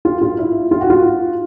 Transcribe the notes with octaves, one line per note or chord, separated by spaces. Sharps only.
F4
F4
E4
F4
F#4
F4